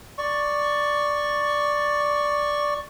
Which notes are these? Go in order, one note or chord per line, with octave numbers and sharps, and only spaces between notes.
D5 C#6